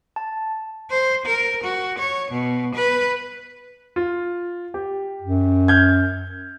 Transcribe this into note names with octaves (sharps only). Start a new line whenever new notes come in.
A5
C5
A#4
F#4
C#5
B2
B4
F4
G4
F#2
F6 G6 G#6